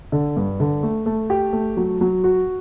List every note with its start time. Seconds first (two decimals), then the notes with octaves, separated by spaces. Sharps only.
0.12 D3
0.36 G2
0.60 D3
0.83 A3
1.06 A3
1.30 G4
1.53 A3
1.77 F#3
2.01 F#3
2.24 F#4